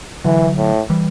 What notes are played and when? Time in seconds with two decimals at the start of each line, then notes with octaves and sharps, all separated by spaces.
0.24 D3 E3 F#3
0.58 A2
0.90 E3 G3